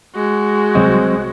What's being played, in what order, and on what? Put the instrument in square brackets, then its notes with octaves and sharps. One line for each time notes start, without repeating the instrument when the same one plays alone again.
[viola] G#3 F#4
[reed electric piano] C2 F#3 D#5 [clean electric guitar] C4